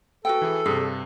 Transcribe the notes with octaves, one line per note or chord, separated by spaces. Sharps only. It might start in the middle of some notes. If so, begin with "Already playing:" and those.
F#4 A4 B4 G5
E3 E4 G#4
G2 C3 G#4